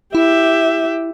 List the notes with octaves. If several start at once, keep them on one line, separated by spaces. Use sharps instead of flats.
E4 G4 E5